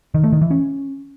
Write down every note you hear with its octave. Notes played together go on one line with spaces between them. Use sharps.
D#3
A3
D#3
E3
C#4